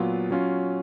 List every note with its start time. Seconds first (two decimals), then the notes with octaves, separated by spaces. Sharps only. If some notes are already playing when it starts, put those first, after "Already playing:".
Already playing: A#2 F#3 B3 F4
0.31 F#3 C#4 F4